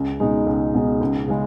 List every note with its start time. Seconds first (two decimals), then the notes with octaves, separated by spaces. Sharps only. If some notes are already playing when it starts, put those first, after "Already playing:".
Already playing: C#2
0.20 B2 G#3 D#4
0.47 C#2
0.74 B2 G#3 D#4
1.01 C#2
1.28 C#3 G#3